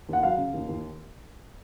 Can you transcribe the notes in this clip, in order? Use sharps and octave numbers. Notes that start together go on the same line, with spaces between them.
D#2 F#5
F#3 F5
C#3
D#2
D#2